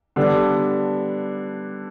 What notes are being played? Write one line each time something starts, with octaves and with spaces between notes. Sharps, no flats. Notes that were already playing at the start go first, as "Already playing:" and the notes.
D3 G3 B3 D4